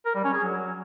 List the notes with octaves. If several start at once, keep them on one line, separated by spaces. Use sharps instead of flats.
A#4
G3
C#4
G#4
F#3